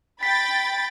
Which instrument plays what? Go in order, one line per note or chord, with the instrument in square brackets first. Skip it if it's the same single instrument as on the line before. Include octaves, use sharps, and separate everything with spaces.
[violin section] G5 B5 A6 [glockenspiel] B6